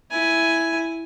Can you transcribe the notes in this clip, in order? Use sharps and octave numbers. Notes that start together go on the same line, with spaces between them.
E4 G#5